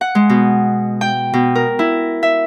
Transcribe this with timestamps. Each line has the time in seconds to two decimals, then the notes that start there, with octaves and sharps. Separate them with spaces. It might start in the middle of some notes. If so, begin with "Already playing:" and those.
0.01 F#5
0.15 G#3
0.29 B2
1.01 G5
1.34 B2
1.55 A#4
1.79 E4
2.23 E5